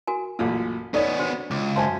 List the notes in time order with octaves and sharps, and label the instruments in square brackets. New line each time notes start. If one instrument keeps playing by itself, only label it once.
[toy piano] F#4 A#4 G#5
[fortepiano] A1 F#2 A#2
[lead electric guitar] B3 C#4 [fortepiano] D#4 C#5 [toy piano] A4 D5 D#6
[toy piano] D4 F#4 C5
[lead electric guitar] C#2 [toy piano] D6
[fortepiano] F#2 C5 G#5 [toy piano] F#4 E5 A5